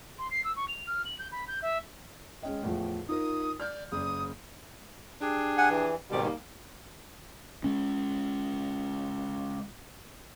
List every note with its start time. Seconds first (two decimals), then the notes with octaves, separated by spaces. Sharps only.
0.19 C6
0.31 C7
0.44 E6
0.56 C#6
0.68 F7
0.87 F6
1.05 F#7
1.19 G6
1.32 B5
1.48 G6
1.62 E5
2.43 G#3 C#4 D#5 G5
2.62 E2 A2 F3
3.09 D#4 F4 A#4 D#6
3.60 D5 F6 G6
3.92 F#1 D5 D#6
5.21 D4 G4 G#4
5.57 F#5 G#5
5.70 E3
6.11 G#2 B2 D#3 G3 C4 D5
6.24 G3 A#3 D#4
7.64 G#3 C#4